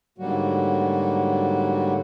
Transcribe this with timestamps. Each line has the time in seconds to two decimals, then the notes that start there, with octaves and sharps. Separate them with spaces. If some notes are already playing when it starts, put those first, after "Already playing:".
0.18 G#2 D3 F#3 G3 A#3 F#4